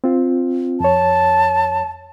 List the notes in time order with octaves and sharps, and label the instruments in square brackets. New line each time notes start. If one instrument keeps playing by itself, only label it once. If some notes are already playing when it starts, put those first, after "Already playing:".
[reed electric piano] C4 F4
[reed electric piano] F2 C#5 [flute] A5